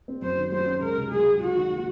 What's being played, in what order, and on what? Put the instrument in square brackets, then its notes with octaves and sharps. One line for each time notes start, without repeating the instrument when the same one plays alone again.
[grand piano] C4
[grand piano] F#2 [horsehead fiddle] C5
[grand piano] D#3
[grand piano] F#3 [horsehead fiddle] C5
[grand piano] C#4
[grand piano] C#2 [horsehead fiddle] A#4
[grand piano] C3
[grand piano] F#3 [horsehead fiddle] G#4
[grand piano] C#2
[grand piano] G#2 [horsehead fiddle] F#4
[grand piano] D#3
A#3